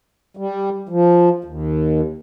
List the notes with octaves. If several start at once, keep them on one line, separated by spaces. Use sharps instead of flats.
G3
F3
D#2